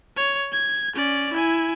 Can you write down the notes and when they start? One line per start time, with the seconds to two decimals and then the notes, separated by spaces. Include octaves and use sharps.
0.17 C#5
0.53 G#6
0.95 C#4 D5
1.33 E4 G#5